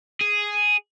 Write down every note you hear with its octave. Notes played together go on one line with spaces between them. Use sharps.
G#4